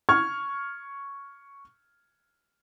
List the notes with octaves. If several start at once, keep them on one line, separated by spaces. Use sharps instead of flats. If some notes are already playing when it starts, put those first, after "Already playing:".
C#6 F6 G#6